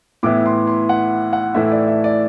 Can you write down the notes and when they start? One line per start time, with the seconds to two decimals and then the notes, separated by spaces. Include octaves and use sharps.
0.23 A2 E3 B3 E4 D6
0.46 C6
0.67 C6
0.89 F#5
1.33 F#5
1.54 A2 E3 A3 E4 E5
1.71 D5
1.88 E5
2.04 D5